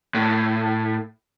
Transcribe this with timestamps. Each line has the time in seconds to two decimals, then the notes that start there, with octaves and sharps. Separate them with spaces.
0.14 A2